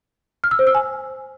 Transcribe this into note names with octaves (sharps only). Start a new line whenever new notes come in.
F6
E6
C5
E6
G#5